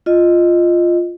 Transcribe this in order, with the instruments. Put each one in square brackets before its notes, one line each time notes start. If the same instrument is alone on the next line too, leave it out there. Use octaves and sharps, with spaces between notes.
[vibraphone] F4 D#5